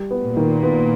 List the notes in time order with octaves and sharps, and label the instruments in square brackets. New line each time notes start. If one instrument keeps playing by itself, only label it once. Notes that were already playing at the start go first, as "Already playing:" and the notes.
Already playing: [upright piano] G3
B3
[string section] A#2
[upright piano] D#3
B3